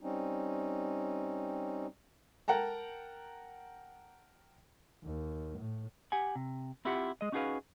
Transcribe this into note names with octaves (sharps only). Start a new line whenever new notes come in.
G3 C4 C#4 D#4
A#4 F#5 G5 A5 A#5
D#2
A2
G4 F#5 G#5
C3
C4 E4 F4 G4 E5 F#5
G#3 D#5
C#4 D#4 F#4 G#4 B4 F5